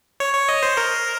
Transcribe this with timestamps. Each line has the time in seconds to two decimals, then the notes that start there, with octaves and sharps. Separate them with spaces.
0.20 C#5
0.34 C#5
0.49 D#5
0.63 C5
0.77 A#4